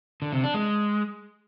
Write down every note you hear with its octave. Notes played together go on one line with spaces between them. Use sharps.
D3
C3
D4
G#3